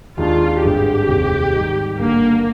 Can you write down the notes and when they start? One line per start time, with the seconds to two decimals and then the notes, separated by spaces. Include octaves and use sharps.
0.17 D#2 D#3 G#3 D4 F4
0.63 G#1 G2 D3 G#3 G4
1.08 F1 D#2 D#3 G#3 C4
1.53 G#2 D#3 G3
1.98 G1 G2 D3 A#3